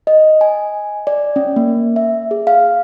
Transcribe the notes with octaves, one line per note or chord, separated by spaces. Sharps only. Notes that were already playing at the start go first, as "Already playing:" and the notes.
D#5
G#5
D5
C#4
A#3
E5
G#4
F5